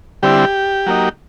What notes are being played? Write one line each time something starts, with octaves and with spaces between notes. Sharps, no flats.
D3 G3 C4 E4 G4
F#3 A#3 D#4